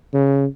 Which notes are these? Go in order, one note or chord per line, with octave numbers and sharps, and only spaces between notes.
C#3